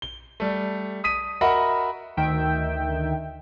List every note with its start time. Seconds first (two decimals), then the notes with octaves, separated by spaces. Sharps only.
0.02 G7
0.40 G3 A3
1.04 D#6 B6 D#7
1.41 F#4 A#4 D#5 E5 F#5 B5
2.17 D2 D#3 E5 G5